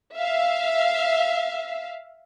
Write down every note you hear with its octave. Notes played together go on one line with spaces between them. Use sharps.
E5 F5